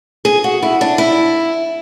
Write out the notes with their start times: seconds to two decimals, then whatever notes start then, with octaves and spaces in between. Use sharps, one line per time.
0.25 G#4
0.44 F#4
0.63 E4
0.81 D4
0.98 E4